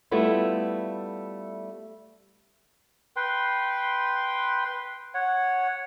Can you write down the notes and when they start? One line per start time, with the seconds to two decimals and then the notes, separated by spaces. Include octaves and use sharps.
0.11 G3 A3 B3 E4 F4
3.16 B4 G5 C6
5.14 C#5 F#5